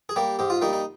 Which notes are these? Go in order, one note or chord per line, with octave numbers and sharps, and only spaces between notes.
G#4
G3 A#3 G4
G#2 G4
F4
G3 A#3 D#4
D#4